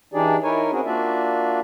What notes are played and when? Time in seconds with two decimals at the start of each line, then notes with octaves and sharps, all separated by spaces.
0.14 E3 D4 D#4 G4 G#4 D5
0.43 D#4 E4 A#4 C#5 G#5
0.72 C4 C#4 F#4 G#4 A#4
0.86 A#3 D4 F4 F#4 D5 E5